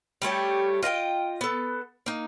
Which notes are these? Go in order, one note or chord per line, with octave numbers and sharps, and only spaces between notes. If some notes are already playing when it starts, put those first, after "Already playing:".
G3 A3 C#4 G4
F4 D#5 F#5 G5
B3 A4
A#3 D#4